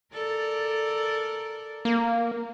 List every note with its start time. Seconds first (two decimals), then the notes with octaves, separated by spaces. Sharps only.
0.14 A4 A#4 D5
1.85 A#3